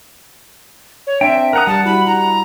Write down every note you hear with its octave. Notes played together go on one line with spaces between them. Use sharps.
C#5
C4 D4 E5 G5
A#4 F#5 A#5 D#6
G3 F#5 A5
G3 E4 F#4 B5
E4 A#5